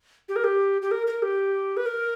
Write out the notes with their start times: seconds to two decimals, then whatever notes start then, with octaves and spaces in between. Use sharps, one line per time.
0.29 G4
0.36 A#4
0.44 G4
0.82 G4
0.91 A#4
1.07 A#4
1.22 G4
1.77 B4
1.86 A#4